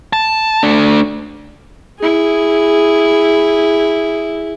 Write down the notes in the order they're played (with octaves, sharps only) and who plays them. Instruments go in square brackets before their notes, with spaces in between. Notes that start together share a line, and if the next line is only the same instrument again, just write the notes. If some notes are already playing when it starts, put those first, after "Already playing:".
[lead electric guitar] A5
A3 D4
[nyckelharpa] E4 G#4